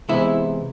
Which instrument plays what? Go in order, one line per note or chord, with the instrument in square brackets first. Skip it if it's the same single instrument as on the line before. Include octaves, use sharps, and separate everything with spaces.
[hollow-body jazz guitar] C3 E3 G#3 B3 E4